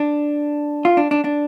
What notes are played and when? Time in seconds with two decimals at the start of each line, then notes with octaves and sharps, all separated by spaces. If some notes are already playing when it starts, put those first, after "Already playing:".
Already playing: D4
0.85 F4
0.97 D4
1.11 D4
1.24 D4